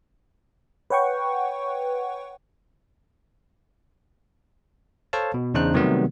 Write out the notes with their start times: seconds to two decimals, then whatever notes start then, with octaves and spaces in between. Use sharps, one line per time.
0.90 B4 C#5 F#5 G5 C#6
5.13 A4 C5 C#5 F5 A5
5.34 B2
5.54 E2 C#3 D4 D#4 C5 F#6
5.74 C3 D#3 F#3 G3 A3 B3